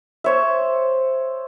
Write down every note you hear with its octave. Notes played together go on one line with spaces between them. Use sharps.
C5 C#5 E5